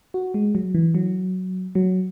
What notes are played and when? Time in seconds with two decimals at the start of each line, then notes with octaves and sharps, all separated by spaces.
0.14 F#4
0.34 G#3
0.55 F#3
0.74 E3
0.95 F#3
1.75 F#3